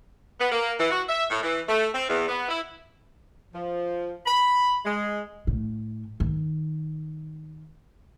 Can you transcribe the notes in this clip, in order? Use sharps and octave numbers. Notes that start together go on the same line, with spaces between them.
B3
A#3
E3
F#4
E5
A2
E3
A3
C4
E2
B3
E4
F3
B5
G#3
A2
D#3